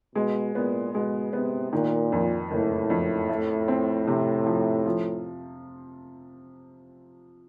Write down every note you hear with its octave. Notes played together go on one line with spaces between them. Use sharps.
B2 G#3
A#2 B3
B2 G#3
C3 B3
A#2 D#3
F2
F#1 A2
F2
A3
C4
C3
F3
F3